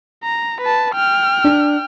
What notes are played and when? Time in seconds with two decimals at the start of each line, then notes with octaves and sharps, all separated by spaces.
0.24 A#5
0.61 B4 A5
0.94 G5 F6
1.44 D4